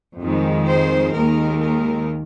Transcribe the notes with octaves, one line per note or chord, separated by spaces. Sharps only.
F2 D#3 G#3
C5
D#2 D#3 G#3 A#4
A#4